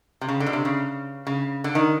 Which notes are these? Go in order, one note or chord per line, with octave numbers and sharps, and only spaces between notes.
C3
C#3
D3
B2
C3
C#3
C#3
D3
D#3